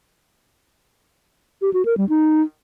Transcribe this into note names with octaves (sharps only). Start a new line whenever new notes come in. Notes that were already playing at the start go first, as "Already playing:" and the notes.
G4
F#4
A#4
G3
D#4